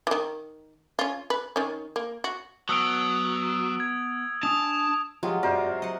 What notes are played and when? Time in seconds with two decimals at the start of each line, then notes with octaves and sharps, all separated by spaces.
0.07 D#3 E3
0.99 C#4 F4
1.30 B4
1.56 D#3 C#4
1.96 A#3
2.24 F#4
2.69 F#3 B3 A5 D#6 E6 F#6 D7
3.80 G#6
4.43 D4 G#5 A5 D#6 F7
5.23 F3 F#3 G#3 F4 G4 D#6
5.43 F#2 C3 F#4 A#4 C5 D5
5.82 F#3 D#5 F#5